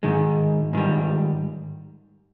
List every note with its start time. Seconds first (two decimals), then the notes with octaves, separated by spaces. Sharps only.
0.03 G#2 D#3 G#3
0.73 G#2 D#3 G3